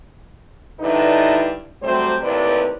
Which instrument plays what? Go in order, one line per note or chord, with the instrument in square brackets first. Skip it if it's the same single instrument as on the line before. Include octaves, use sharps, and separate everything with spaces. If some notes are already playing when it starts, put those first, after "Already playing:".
[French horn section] G2 D3 D#4 E4 B4 D5
C3 F#3 G3 A3 C5
D#2 A2 C3 B4 D5